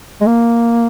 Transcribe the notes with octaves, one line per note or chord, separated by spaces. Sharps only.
G#3
A#3